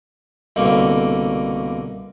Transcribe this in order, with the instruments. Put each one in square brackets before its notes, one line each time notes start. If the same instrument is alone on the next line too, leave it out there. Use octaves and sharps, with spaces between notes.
[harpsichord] C2 B2 D3 A#3